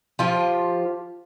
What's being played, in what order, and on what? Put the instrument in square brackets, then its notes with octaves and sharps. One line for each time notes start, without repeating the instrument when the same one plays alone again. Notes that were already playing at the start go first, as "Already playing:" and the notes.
[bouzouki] F3 F4 G4